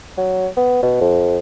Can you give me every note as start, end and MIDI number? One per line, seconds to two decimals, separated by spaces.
0.18 0.47 54
0.57 0.80 59
0.83 0.99 47
1.01 1.39 41